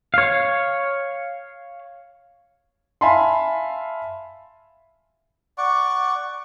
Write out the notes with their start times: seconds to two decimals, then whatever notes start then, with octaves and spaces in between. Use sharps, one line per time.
0.14 C#5 F5
3.01 E5 F5 G#5 A5 B5 C6
5.58 D5 F#5 C#6